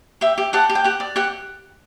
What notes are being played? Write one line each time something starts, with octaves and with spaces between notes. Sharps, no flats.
G4 E5 G5
G4
G4 F#5 A5
G4
G5
G4 F#5
D5
G4 F#5